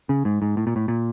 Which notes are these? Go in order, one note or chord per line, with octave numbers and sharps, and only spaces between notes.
C#3
G#2
G#2
A2
A#2
A2
A#2